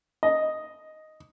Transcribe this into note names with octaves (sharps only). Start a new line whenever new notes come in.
D#5